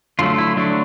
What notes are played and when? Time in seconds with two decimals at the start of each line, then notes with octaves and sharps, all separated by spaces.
0.19 D3 F#3 A3 F4
0.38 E4
0.57 D3 F#3 A3 D4